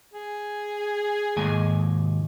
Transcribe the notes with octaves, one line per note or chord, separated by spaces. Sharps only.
G#4
D#2 G#2 G#5